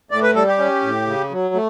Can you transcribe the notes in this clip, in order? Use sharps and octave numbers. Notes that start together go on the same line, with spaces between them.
A2 D5
B4
G3 A4
G4
C#4
A2
C#3
F#3
A3